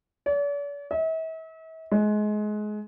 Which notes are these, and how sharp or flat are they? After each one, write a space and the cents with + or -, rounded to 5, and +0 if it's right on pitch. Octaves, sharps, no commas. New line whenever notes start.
D5 -45
E5 -40
G#3 +25